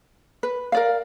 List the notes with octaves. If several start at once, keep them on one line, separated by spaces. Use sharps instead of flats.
B4
A#4 D5 F5